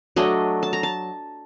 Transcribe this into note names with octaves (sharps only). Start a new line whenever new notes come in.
F#3 A3 D4 D#5
A5
A#5
A5